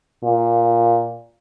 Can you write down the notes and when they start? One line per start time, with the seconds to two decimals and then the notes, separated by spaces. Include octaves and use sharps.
0.23 A#2